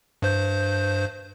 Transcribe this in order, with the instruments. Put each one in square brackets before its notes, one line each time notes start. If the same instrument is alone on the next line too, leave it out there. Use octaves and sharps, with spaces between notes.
[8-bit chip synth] G2 C5 G6